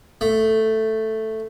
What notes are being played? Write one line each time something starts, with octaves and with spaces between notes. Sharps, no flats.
A3